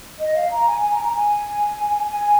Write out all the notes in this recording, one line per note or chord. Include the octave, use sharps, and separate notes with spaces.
D#5
F5
A#5
G#5
G#5
A#5
A#5
G#5
G#5